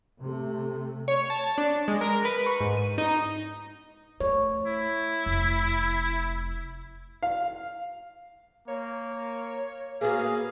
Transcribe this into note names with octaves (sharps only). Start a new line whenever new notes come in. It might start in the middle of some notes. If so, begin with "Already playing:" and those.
C3 A3
C#5
A5
A6
D4
G#3
A#4
B4
C#6
G#2
D#7
D#4
A3 C#5
E4
F1
F5
A#3 C#5
A#3 B3 F#4 G#4 F5